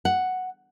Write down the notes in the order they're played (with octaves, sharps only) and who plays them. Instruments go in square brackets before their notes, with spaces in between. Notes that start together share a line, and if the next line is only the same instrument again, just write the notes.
[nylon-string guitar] F#5